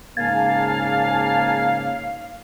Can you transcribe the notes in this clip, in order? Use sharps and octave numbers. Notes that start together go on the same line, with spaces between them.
G#2 C#3 A#3 F5 G#5 A5